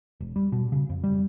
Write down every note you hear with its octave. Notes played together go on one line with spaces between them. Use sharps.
E1
G3
B2
C#3
F2
G3